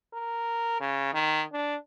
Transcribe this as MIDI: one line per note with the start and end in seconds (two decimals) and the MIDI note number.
0.13 0.80 70
0.80 1.09 49
1.14 1.43 51
1.53 1.75 62